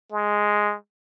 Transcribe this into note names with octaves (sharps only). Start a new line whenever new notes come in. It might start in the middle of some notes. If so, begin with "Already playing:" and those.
G#3